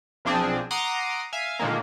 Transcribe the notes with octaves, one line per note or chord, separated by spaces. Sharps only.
B1 F3 C4 D4 G#4
F#5 A#5 C6 D6 D#6
E5 F5 G#5
A#2 D3 D#3 G#3 A#3